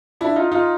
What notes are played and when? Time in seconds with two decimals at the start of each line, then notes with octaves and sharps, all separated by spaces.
0.21 D4 E4
0.36 D#4 F4
0.51 D#4 F4